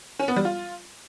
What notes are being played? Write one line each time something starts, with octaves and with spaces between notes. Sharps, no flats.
C#4
B3
G3
F4